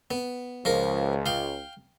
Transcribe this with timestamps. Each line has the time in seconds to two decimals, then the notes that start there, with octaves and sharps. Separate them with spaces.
0.11 B3
0.65 C#2 F3 A#4
1.26 F5 G5